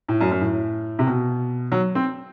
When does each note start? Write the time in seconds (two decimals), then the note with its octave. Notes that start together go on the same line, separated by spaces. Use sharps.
0.09 A2
0.21 F#2
0.31 F#2
0.41 A2
0.99 C3
1.07 B2
1.72 F#3
1.95 C4